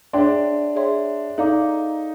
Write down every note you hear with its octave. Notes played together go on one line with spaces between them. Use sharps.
D4 G#4 C#5 E5 G5 C6
G#4 C#5 E5 G5 C6
D#4 A4 D5 F5 A#5 D6